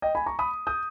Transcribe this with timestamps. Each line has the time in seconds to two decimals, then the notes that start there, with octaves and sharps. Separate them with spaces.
0.02 D#5 G5
0.15 G#5 B5
0.26 A#5 C#6
0.39 B5 D#6
0.67 D#6 G6